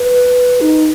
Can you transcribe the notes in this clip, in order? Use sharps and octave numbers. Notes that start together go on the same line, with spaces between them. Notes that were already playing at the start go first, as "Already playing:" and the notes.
Already playing: B4
D#4